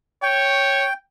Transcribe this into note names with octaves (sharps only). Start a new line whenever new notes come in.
C#5 G5